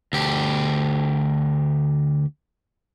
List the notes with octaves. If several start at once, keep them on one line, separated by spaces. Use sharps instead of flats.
D2 G4